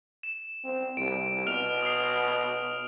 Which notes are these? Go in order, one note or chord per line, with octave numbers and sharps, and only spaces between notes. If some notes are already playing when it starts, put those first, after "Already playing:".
E7
C4
C2 D7
B2 F6 D7 F7
D#6 C7